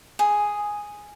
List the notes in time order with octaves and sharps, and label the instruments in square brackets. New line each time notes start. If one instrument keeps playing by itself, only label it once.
[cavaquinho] G#4